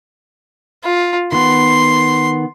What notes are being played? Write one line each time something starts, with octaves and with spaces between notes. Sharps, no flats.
F4
D#3 B3 C6